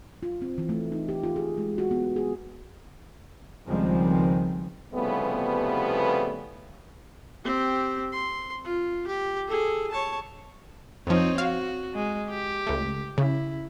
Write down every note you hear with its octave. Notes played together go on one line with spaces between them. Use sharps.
F4
C4
E3
A3
D#4
G4
F4
G#4
G#3
F#4
B3
G#4
C#2 D#3 F3 G3 G#3 C4
C2 C#3 F3 G3 A3 B3
C4 G4
C6
F4
G4
G#4 A4
C#5 A5
F2 F3 C4 D#4 C#5
F#4 F5
G#3
G4
C#2 A3
C#3 E4